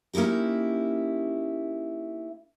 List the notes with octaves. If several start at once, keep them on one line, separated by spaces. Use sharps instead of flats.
A#3 C#4 D#4 E4 G4